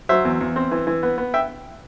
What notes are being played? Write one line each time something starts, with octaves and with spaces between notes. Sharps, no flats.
F#3 C5 E5
E2
E2
C4
E3
E3
B3
B3
E5 G5